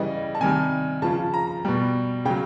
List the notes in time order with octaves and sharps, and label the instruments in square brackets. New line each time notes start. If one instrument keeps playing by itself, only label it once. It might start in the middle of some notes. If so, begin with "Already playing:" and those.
Already playing: [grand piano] C#3 E3 G3 D#5
A5
C3 D#3 G3 G#5
C#3 F3 A5
A#5
B2 G3
C#3 F#3 G5